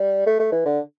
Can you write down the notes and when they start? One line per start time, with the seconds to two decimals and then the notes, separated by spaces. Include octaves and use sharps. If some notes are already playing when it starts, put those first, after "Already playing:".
Already playing: G3
0.27 A3
0.40 A3
0.52 E3
0.66 D3